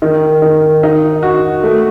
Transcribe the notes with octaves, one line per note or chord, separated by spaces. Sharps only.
D#3
D#3
D#4
F#4
A3